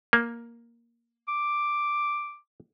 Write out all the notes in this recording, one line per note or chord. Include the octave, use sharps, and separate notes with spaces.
A#3
D6